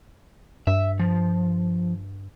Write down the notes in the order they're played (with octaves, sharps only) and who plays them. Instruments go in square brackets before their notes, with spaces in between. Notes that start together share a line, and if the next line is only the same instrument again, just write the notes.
[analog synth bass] G2 [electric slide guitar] E5
[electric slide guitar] F3